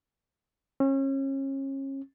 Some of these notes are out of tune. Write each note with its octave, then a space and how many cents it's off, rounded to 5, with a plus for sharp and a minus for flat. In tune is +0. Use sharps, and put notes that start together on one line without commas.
C#4 -35